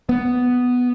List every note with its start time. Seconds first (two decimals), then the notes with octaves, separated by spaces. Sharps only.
0.09 B3